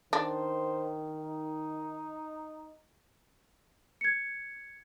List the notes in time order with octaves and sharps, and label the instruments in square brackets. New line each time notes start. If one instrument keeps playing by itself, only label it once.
[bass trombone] D#3 [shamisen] D4 [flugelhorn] C5
[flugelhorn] D#4
[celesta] G#6 C#7